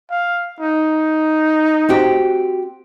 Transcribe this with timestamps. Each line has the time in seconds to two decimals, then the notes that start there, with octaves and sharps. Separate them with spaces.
0.10 F5
0.60 D#4
1.89 C4 F#4 G4